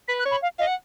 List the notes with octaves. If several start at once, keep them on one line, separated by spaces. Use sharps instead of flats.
B4 B6
F#6
C#5
B5
F5
D#5 F5
F#5